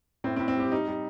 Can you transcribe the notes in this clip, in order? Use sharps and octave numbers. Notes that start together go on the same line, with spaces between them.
A2 C4
C4
A2
C4
G3 G4
G3 D#4
G3